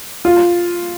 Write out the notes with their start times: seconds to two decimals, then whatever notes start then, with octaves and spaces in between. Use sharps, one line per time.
0.25 F4